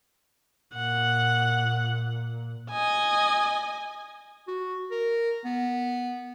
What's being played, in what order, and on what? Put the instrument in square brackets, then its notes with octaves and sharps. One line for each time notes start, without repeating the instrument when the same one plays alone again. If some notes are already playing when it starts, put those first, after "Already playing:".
[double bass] A#2 [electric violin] F#5
[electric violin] D#5 G#5
[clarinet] F#4
A#4
B3